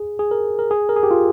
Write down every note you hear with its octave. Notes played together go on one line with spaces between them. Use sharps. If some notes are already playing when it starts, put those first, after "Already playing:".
Already playing: G#4
G#4
A#4
A#4
G#4
A#4
G#4
G4
F4